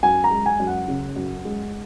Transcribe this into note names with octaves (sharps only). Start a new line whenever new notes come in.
F#2 G#5
A#5
G#3
G#5
F#2
F#5
C#3
F#2
G#3